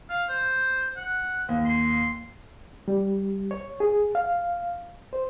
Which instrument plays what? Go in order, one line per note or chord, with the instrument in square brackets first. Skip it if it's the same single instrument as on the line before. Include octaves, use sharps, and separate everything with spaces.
[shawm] F5
C5
F#5
[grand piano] D#2
[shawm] C6
[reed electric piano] G3
C#5
G#4
F5
C5